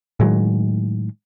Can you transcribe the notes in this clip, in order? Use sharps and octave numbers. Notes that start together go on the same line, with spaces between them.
A2 D#3 F#3 G#3